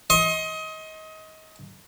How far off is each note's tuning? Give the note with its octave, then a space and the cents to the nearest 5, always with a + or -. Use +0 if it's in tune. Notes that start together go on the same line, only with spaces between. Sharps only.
D#5 +25 C6 +40